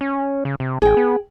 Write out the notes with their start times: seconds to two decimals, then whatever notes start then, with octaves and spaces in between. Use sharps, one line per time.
0.01 C#4
0.45 C#3
0.60 C3
0.82 A1 G#4 G5
0.97 B3